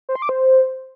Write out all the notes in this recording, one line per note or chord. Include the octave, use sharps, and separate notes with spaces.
C5
C6
D6
C5